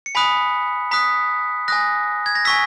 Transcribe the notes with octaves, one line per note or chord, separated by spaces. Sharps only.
C#7
G#5 B5 D#6 F#6 B6
A#5 D#6 F#6 B6
G#5 D#6 F#6 A#6
G#6
A#6
G#5 C#6 E6 B6